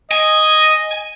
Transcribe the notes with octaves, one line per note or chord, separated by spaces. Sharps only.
D#5 G#5